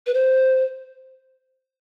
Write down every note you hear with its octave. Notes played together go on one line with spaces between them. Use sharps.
B4
C5